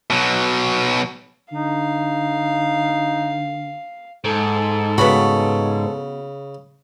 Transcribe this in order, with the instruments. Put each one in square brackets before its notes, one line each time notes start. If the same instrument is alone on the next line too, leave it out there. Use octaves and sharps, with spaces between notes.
[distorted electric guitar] B2 F#3
[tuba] D3 [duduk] D#4 [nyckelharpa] F5
[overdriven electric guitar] G#2 [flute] A4
[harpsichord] C#3 B5 [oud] B3 F#4